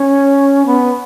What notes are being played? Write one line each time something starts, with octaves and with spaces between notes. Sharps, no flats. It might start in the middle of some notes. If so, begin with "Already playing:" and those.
Already playing: C#4
B3